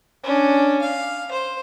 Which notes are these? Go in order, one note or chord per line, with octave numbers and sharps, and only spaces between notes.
C#4 D4
F5
C5